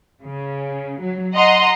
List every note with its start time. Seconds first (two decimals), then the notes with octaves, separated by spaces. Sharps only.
0.23 C#3
1.00 F#3
1.35 D#5 F#5 A#5 C6